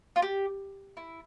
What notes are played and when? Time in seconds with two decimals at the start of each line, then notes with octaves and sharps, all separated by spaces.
0.16 F4
0.22 G4
0.97 E4